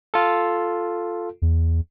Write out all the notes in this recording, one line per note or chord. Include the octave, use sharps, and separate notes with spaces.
F4 A4
E2